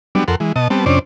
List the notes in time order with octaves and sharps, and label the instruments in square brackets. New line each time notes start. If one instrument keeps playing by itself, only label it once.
[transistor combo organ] F#3 G3 B3 D4
F2 A4 A#4 F#5 C6
E3 G#3
B2 D#5 A5
G3 B3 C4 A5
F2 C3 C#4 D4 C5 D5